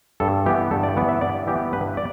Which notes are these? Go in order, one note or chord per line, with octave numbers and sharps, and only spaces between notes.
G2 A4
E3 B3 G4
G2 A4
D5
E3 B3 D5
E5
G2 D5
E3 B3 G4
G2 B4
D5